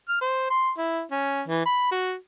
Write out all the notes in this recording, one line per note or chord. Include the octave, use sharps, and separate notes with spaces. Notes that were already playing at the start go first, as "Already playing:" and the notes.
F6
C5
C6
E4
C#4
E3
B5
F#4